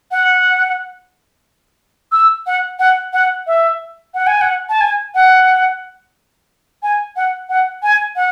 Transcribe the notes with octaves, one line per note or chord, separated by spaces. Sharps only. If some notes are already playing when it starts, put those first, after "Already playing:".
F#5
E6
F#5
F#5
F#5
E5
F#5
G#5
F#5
A5
G#5
F#5
G#5
F#5
F#5
G#5
F#5